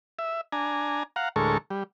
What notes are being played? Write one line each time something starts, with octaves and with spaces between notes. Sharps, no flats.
E5
D4 G#5 A#5
F5 F#5 A#5
D2 A2 G#3 A4 A#4 C#6
G3